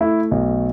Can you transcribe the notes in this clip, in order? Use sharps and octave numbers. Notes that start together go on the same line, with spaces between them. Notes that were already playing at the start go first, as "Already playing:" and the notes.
A3 E4
B1